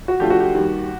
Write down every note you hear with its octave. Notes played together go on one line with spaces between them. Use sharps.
F#4
F3 A3 D4 F4 G4
F#4
G4
D#2 D#3 G3